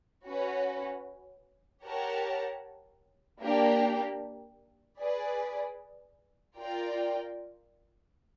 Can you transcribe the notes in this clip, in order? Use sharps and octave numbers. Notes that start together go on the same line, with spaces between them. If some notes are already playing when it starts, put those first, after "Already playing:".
C#4 F#4 B4
G4 A#4 C#5 F#5 A5
A#3 D4 G4
G#4 B4 D5
F4 A#4 D5 G5